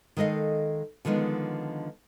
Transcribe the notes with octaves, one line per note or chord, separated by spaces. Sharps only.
D#3 G#3 A4 D#5 F5
D3 D#3 F3 G#3 B3